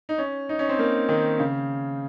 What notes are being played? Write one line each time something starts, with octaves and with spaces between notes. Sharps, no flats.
D#4
C#4
D#4
C#4
C4
A#3
D#3
C#3